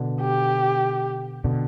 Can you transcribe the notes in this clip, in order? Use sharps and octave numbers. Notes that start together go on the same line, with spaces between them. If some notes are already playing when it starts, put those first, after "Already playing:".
Already playing: B2 D3
G4
B2 D3